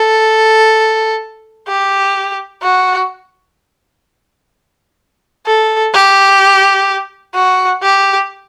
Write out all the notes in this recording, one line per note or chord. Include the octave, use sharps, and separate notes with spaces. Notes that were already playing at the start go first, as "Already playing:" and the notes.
Already playing: A4
G4
F#4
A4
G4
F#4
G4